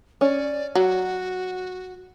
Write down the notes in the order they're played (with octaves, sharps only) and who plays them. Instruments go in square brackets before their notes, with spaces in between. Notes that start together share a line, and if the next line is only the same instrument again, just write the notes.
[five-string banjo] C#4 [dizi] D5
[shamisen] F#3 [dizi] F#4